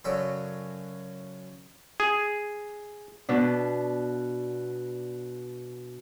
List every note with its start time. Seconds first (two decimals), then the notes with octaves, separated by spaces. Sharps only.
0.04 F#2 C#3 F#3 A4 D5
2.00 G#4
3.29 B2 D4